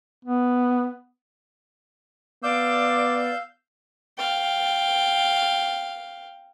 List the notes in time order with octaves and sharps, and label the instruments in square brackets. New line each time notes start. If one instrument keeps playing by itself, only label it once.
[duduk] B3
[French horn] B3 [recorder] D5 [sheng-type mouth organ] F5 E6 G6 [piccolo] D6
[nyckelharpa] F5 G5